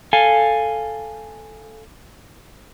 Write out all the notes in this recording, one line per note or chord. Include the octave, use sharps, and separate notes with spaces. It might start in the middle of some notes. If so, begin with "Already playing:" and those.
A4 F5 G#5